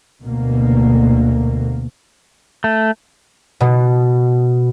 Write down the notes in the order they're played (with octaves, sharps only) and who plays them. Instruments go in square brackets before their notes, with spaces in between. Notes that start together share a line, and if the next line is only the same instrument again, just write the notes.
[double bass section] D2 B2 A#3
[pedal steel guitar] A3
[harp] B2